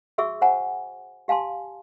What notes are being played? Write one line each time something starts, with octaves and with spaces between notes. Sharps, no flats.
F#4 G#4 E5 C#6 E6
C5 F#5 G#5 A#5
G4 F5 G#5 A5 C6